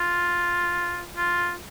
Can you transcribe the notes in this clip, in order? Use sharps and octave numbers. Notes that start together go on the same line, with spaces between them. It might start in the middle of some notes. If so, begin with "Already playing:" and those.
Already playing: F4
F4